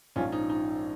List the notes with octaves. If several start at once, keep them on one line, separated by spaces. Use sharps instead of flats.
A#1 G#2 F3 C#4 F4
D#4
D#4